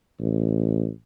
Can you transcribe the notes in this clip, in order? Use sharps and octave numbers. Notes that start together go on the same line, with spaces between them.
A1